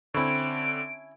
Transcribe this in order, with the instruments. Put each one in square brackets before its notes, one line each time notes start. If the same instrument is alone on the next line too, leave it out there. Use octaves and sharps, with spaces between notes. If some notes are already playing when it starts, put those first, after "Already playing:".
[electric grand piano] D3 C4 [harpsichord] C#4 E4 C#5 [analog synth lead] D7